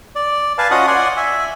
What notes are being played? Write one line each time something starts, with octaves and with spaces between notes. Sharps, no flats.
D5
B4 F5 G#5 A5
C#4 F4 F#4 D#5 F#5 D#6
D5 F#5 G#5 C6
E5 G#5